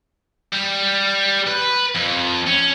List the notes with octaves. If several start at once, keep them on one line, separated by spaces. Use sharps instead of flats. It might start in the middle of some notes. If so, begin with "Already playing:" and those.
G3
B4
F2
C#4